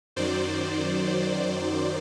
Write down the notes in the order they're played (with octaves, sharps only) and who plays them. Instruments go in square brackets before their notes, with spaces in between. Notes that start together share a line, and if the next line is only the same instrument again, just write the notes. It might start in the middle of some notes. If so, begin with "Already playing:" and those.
[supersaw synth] F#2 D#3 F#3 C5 D5